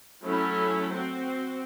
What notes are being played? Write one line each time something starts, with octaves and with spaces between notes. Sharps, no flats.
F#3 A3 C#4 E4 A4
C4 F#4 C5